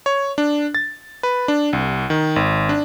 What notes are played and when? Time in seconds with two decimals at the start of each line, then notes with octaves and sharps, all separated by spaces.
0.06 C#5
0.38 D4
0.75 A6
1.23 B4
1.48 D4
1.73 C2
2.10 D#3
2.36 G#1
2.69 D4